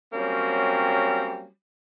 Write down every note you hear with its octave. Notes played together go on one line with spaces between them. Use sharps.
F#3 G3 A#3 C4 C#4